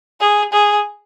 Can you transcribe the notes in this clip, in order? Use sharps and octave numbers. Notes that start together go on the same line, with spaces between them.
G#4
G#4